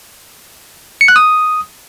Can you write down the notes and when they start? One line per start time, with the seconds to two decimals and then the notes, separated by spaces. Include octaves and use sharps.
1.01 C#7
1.08 F#6
1.16 D#6